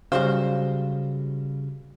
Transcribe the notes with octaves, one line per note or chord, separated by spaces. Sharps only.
C#3 F#3 G3 C4 F#4 C5 F5